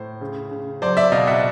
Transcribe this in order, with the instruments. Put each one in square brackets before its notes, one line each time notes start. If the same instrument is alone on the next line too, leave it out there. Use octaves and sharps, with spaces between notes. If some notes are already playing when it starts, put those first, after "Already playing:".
Already playing: [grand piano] A2 C5
C#3
C#3
F#3 C5 D5
D5 E5
B2 D#5 F5
E5 F#5